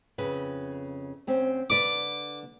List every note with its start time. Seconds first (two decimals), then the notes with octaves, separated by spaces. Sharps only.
0.18 F2 C#3 B4
1.27 D2 C4 C#4
1.70 D3 B4 D5 D6